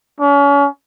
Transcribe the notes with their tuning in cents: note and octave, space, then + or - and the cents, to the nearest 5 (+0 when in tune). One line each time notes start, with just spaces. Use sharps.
C#4 +35